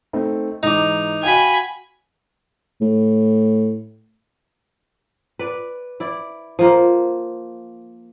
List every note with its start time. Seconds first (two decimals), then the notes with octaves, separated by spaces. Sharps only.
0.13 A3 C4 D#4
0.63 G#2 E3 D#4 D6
1.23 F#4 F5 G5 G#5 B5
2.81 A2
5.39 B4 D5
6.00 E4 D5
6.59 F3 A#3 A#4